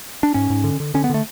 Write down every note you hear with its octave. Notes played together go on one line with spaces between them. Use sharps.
D4
G#2 C#4
G#2
D3
D3
D3 C#4
B3
D3 A3